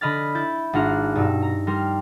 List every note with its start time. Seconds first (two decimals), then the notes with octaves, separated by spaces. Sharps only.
0.01 D3 D#5 B5 F6 A6
0.35 E4 G6 A6
0.73 G#1 D4 F4 F#5 A#5 F6
1.15 G2 B2 D#4 E6
1.43 A#5
1.67 G3 A#4 C6 F6